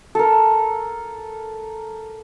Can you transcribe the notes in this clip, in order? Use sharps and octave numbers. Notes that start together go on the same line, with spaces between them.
A4 A#4